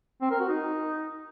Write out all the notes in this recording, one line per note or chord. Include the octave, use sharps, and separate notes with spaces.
C4
A#4
F#4
D#4